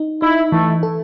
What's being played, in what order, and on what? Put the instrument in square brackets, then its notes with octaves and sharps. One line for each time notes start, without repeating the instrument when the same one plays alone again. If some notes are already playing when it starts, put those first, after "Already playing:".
Already playing: [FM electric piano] D#4
[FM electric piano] D#4 [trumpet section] E4
[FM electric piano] E3 [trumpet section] A3
[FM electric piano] A4